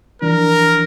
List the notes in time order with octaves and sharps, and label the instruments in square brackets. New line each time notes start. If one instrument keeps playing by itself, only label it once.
[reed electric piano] E3 F3 D4 [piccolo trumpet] A#4